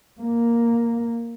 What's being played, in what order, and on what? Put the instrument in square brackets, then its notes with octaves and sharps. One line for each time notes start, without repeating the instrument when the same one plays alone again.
[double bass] A#3